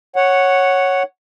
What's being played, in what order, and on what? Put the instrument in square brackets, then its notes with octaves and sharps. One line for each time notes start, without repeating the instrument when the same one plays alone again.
[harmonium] C#5 F#5